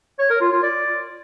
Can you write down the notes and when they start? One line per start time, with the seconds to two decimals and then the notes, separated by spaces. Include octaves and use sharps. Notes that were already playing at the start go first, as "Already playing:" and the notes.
0.19 C#5
0.30 A#4
0.41 F4
0.52 F4
0.63 D5